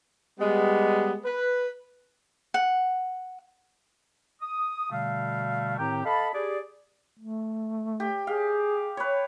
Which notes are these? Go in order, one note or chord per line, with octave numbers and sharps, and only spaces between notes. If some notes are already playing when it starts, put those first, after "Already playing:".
G3 G#3 B3
B4
F#5
D#6
B2 D3 G3 A3 F5
A2 D#3 C4 G4 G5 A#5
A4 D#5 F5 A5 B5
G4 G#4 D5
A3
G4
G#4 F5
B4 C#5